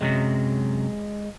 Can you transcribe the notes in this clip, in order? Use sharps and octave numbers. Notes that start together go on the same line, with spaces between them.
F#2 C3 F#3 G#3